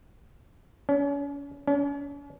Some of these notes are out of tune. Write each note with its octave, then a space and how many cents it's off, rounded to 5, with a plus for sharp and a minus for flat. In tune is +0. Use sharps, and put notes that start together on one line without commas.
C#4 +40
C#4 +45